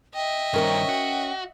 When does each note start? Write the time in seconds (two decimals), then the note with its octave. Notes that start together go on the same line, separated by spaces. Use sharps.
0.15 D#5 E5 G5
0.54 G2 D#3 C#4 A#4 C#5
0.89 F#4